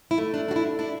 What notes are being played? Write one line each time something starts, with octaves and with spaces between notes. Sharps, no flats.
E4
A3
D4
D4 F#4
E4
D4 E4